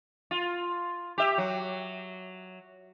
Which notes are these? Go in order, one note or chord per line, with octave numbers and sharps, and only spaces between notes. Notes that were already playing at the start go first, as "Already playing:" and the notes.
F4
G4 E5
F#3